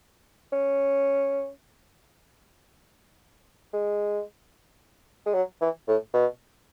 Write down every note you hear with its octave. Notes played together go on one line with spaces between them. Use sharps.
C#4
G#3
G#3
F#3
E3
A2
B2